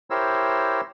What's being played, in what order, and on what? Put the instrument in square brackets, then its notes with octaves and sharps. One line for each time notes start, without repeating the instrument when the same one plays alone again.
[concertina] E4 G4 A#4 C5 C#5 E6